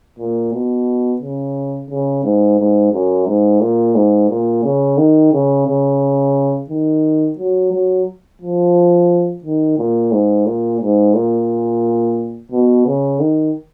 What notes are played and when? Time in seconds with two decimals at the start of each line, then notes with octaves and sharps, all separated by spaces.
0.19 A#2
0.53 B2
1.21 C#3
1.90 C#3
2.24 G#2
2.59 G#2
2.93 F#2
3.27 G#2
3.61 A#2
3.95 G#2
4.29 A#2
4.64 C#3
4.98 D#3
5.33 C#3
5.67 C#3
6.69 D#3
7.38 F#3
7.72 F#3
8.41 F3
9.44 D#3
9.78 A#2
10.12 G#2
10.46 A#2
10.80 G#2
11.14 A#2
12.51 B2
12.86 C#3
13.20 D#3